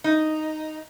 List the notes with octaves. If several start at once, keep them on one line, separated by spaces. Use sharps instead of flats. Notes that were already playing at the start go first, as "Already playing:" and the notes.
D#4